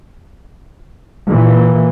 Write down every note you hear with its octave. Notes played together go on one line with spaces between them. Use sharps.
A#2 E3